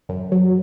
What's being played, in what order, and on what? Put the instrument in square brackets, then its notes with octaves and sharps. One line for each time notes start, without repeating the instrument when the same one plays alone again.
[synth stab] F#2
F#3